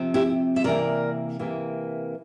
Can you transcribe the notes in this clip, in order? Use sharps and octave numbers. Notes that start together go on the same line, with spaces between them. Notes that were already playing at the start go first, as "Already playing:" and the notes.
Already playing: C3 F3 C4
E4 G4
E5
C3 E3 A#3 A#4 D5
C3 E3 A#3